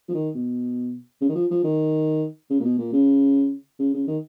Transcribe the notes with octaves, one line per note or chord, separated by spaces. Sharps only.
F3
D#3
B2
C#3
D#3
F3
F3
D#3
C#3
A#2
B2
A#2
C#3
C#3
C#3
D#3